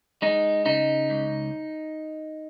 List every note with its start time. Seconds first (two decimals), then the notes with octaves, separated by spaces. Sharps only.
0.22 G#3 D#4
0.66 C#3 D#4
1.10 C#2